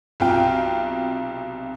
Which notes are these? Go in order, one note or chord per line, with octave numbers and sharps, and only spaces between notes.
B1 C3 F4 G5